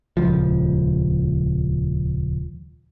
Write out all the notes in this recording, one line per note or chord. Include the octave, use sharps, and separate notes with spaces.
D#1 C#2 F3